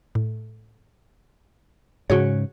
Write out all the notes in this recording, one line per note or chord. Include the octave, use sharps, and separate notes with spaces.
A2
G#2 C#3 F#4 G#4 C#5